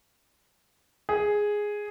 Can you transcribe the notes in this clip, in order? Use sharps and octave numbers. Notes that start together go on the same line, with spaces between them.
G#4